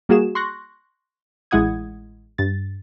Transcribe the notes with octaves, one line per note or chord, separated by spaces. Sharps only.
G3 A#3 F#4 G#4 E7
C6 C#6 F#6 A#6
A1 G#3 E4 F#5 D#6 G#6
G2 A6